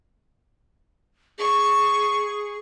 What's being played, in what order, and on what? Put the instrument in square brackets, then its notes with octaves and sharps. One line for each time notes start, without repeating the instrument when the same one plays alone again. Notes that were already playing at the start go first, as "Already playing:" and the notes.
[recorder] G#4 [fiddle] C#6